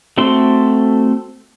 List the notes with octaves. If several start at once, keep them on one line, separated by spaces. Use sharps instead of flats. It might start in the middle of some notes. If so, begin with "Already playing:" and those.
A3 C4 F#4 A4 C6